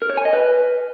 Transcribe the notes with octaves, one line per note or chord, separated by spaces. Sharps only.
A#4
C#5
G#5
D#5
B4